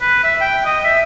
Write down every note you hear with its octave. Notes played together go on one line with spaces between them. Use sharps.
B4
E5
G5
D#5
E5